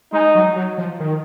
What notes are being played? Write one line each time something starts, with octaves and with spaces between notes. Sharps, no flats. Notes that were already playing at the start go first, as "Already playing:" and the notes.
G#3 D#4
F#3
F#3
F3
D#3